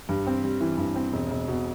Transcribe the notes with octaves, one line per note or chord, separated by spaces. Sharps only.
G2
C4
G3
E3
G2
C4
E1
E1
B2